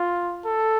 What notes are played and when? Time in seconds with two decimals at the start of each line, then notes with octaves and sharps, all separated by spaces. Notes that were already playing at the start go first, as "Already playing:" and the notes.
Already playing: F4
0.46 A4